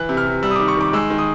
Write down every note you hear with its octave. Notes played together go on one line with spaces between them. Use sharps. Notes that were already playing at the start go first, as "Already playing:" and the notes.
Already playing: E3 F#6
C3
F6
C3
G3 E6
D#6
D#3 D6
C#6
D#3 D6
G#3 E6
D#3
D#6